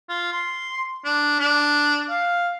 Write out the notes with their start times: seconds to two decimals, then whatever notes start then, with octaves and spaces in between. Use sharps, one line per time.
0.09 F4
0.32 C6
1.05 D4
1.39 D4
2.10 F5